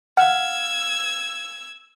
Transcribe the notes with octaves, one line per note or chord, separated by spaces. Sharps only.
F5 F#5 E6 F6 G#6